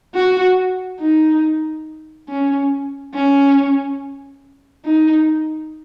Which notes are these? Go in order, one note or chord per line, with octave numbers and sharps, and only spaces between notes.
F#4
D#4
C#4
C#4
D#4